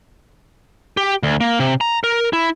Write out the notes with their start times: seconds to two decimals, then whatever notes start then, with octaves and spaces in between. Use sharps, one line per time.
0.97 G4
1.23 D2
1.41 A#3
1.60 C3
1.81 A#5
2.04 A#4
2.33 E4